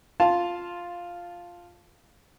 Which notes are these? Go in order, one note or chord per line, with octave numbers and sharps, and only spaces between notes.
F4 F5 A5